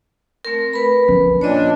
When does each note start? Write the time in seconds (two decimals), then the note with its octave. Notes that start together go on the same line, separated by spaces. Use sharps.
0.45 A3 C4 A#4
0.73 A#4 B4 B5
1.08 F3 C#4
1.41 A#2 D4 C#5 D#5